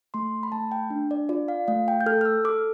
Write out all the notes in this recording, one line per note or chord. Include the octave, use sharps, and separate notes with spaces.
A3 C6
B5
A3 A5
G5
D4
D5
F4 D5
F5
A3 F5
G5
G6
A4 F6
F6
E6
A4 D6